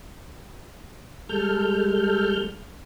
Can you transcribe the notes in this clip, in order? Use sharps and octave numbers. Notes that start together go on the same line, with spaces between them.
G3 G#3 A4 F6 G6